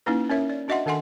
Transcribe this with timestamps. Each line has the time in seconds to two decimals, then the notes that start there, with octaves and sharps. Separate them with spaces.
0.06 A#3 C#4 D#4 E4 B4
0.30 C#4 A#4 C#5 E5
0.50 D5
0.68 D4 F#4 D#5 E5 F#5 C6
0.86 D#3 D4 A4 F#5 G#5 C6